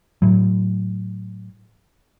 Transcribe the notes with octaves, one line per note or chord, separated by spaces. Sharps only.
A2 F#3